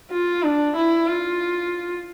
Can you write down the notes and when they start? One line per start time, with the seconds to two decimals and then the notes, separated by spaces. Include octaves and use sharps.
0.11 F4
0.43 D4
0.76 E4
1.07 F4